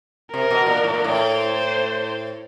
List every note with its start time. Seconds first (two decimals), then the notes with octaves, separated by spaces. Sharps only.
0.33 C3 A#4
0.51 B2
0.67 A#2
0.84 A2
0.94 A#2
1.04 A2
1.34 C5